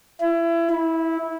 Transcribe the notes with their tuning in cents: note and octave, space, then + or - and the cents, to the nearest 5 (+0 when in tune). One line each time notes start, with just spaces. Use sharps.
E4 +25
E4 -15